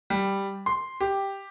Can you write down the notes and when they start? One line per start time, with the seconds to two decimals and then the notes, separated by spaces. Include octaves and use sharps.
0.10 G3
0.66 C6
1.00 G4